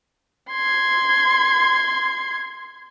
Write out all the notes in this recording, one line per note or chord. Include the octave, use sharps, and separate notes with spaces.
C6 G#6